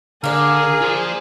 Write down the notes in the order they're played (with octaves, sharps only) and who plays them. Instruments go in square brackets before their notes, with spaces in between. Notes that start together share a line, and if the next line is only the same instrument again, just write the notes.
[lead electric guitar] D3 [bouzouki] A#3 D5 [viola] G#4 [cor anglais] A#4
[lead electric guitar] F4 C5